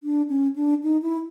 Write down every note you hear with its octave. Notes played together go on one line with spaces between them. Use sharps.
D4
C#4
D4
D#4
E4